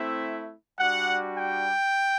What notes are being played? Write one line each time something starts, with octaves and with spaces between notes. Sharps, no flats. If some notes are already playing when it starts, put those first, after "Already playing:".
Already playing: A3 C4 E4 E5
G3 D4 F#4 F#5
G5